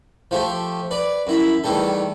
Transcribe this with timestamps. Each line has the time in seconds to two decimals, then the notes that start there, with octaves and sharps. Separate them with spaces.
0.31 F3 A3 G4
0.91 B4 D5
1.27 F#2 E4 B5
1.64 E2 A2 D#3 G3 A4